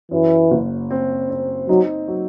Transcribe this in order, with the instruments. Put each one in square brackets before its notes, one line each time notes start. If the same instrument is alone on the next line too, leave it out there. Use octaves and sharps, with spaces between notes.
[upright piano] F#2 [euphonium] E3
[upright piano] F#1
C4
C4
[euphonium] F#3 [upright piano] D#4
[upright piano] F#3